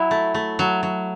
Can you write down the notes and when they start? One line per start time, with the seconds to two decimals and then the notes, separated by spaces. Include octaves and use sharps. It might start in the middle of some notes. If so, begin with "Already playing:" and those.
Already playing: F#3 E4
0.11 A3
0.34 A3
0.59 F#3
0.83 F#3